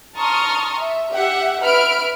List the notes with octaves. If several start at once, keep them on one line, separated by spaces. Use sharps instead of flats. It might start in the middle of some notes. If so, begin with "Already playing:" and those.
A5 A#5 C6 C#6 D#6 F6
E5
G4 E5 F#5
B4 E5 B5 F6 D7